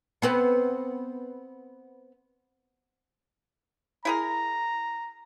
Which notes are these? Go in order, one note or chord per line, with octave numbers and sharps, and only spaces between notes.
B3 C4 B4
E4 G#4 A#4 A#5